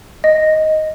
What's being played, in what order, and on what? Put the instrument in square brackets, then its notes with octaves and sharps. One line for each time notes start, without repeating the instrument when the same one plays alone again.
[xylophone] D#5